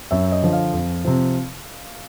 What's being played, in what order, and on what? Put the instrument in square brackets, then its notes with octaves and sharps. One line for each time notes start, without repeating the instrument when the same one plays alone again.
[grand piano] F#2 E5
D#5
D3 F3
F5
F2
C3 F3